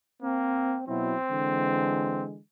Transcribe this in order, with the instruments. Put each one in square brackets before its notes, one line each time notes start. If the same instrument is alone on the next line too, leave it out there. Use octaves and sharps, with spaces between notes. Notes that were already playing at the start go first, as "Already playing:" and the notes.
[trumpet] A#3 [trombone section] C4
[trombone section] B2 F#3 E4 [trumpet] C4
[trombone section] D3 E3 G#3